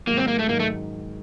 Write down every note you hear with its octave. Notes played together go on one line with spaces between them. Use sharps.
G#2 D#3 F#3 A#3
C4
A#3
A3
G#2 D#3 F#3 A#3
A3